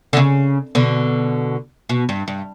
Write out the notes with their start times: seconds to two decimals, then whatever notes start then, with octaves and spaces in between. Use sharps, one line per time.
0.13 D3
0.17 C#3
0.75 B2 D3
1.89 B2
2.09 G2
2.28 G2